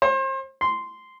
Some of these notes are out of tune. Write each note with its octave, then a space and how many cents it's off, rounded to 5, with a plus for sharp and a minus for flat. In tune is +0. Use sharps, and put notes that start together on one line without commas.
C5 +35
C6 -10